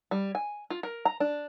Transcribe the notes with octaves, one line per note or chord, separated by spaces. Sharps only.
G3
G#5
F4
A#4
A#5
D4